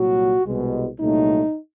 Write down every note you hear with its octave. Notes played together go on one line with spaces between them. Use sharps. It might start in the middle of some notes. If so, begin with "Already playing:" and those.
Already playing: C2 A#2 F#3 F#4
C2 B2 G#3
C2 A#2 F#3 A3 D#4